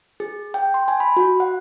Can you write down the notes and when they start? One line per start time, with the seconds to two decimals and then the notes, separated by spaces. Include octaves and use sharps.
0.20 G#4
0.54 G5
0.74 C6
0.88 G#5
1.00 B5
1.17 F#4
1.40 F#5